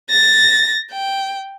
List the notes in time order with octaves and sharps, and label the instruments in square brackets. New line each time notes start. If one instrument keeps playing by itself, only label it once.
[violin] A6 A#6
G5